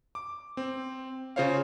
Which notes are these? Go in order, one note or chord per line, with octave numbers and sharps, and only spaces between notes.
D6
C4
C#3 F4 C5 C#5 F5